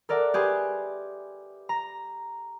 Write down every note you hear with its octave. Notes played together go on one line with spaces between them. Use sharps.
A4 A#4 D5 E5 F#5
G4 G#4 B4 G#5 C6
A#5